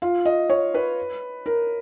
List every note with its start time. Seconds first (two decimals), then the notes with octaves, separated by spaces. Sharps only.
0.02 F4
0.25 D#5
0.49 C#5
0.74 B4
1.46 A#4